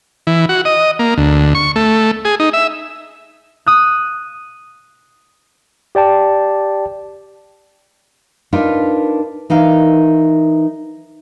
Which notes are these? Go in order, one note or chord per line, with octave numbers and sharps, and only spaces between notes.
E3
F#4
D#5
A#3
D2
C#6
A3
G#4
D#4
E5
D#6 F#6
G4 D5 G5 A5
D4 D#4 F4 A#4 B4
E3 D#4 A#4 F5